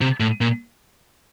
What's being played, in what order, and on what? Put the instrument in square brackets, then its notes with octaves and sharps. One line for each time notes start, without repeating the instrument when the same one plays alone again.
[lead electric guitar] C3
A2
A#2